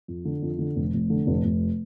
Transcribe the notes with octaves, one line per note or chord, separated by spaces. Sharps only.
F2
D3
F2
D3
F1
F1
D3
F1
F1